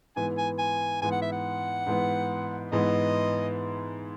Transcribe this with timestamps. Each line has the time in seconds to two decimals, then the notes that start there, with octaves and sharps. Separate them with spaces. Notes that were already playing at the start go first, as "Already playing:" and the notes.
0.16 G#2 E3 B3 G#5
0.38 G#5
0.59 G#5
1.02 G#2 E3 B3 G#5
1.11 F#5
1.22 E5
1.32 F#5
1.86 G#2 E3 B3
2.71 G#2 E3 B3 D#5